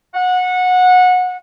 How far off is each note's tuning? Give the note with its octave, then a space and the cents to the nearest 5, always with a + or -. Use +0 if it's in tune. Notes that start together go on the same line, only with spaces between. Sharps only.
F#5 -20